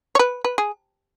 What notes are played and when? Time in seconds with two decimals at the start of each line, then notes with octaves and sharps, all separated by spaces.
0.15 C#5
0.19 B4
0.44 B4
0.58 G#4